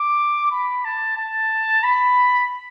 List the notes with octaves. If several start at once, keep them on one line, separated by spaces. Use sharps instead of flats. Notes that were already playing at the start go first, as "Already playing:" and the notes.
Already playing: D6
B5
A5
A5
B5